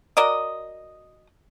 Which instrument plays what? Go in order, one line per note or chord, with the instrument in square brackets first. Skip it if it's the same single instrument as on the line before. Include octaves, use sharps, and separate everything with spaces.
[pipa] F#4 A#4 D5 D#5